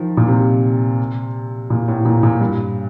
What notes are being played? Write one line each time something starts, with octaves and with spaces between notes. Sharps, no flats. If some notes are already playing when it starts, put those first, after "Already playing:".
Already playing: D#3 F3
A#2
C3
A#2
A2
A#2
A#2
G2